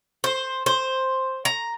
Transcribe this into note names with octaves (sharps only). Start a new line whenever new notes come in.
C5
C5
A#5